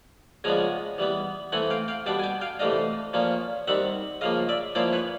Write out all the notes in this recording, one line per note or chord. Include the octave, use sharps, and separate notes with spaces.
C#3 F3 G#3 B3 D4 G#5 A#5
E3 G3 B3
E3 A3 C4 F#5 G#5
F5 G5
F5 G5
B2 G3 B3 D4 G5 A5
G#5
G5 A5
F5 G5
C3 E3 A3 D4 D#5 F5
A#2 F3 A#3 C#4
D#3 G3 C4 E5 F#5
C#3 F3 A#3 D#5 F5
D5 E5
F3 A#3 C#4 E4 C5 D5
B4 C#5